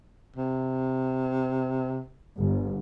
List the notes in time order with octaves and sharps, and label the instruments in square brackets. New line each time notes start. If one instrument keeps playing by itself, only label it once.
[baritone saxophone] C3
[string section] G1